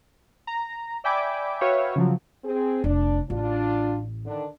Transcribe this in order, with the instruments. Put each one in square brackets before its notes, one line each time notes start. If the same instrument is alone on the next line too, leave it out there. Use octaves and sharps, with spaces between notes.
[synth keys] A#5
D5 E5 G5 G#5 B5 D6
F#4 B4 C#5 E5 F5 G5
C#3 F3 F#3
[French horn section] C4 G#4
[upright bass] F1 [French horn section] D4
[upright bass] A1 [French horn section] D4 F4
[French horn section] D3 D#3 D4